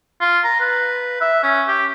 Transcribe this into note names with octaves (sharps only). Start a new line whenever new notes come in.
F4
A#5
B4
E5
C#4
G4